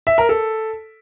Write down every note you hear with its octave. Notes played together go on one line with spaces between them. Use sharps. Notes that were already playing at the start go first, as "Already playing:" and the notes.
E5
A#4
A4